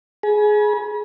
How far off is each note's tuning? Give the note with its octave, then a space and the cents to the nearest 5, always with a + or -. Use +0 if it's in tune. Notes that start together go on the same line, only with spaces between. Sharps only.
G#4 +15 G#5 +25 B5 -40